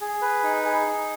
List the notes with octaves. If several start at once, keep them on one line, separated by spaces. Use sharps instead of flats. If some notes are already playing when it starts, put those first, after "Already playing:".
G#4
B4
D#4
G#4
D#4